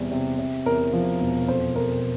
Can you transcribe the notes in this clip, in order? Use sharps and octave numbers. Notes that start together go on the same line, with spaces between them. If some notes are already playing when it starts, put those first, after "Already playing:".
Already playing: E2 C3 G3
C3
C3
E2 A#4
F3
E1
F2 C5
F2 A#4